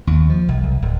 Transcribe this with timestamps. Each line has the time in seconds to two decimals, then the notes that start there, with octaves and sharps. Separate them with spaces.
0.07 D#2
0.29 F3
0.49 B1
0.63 C2
0.82 D1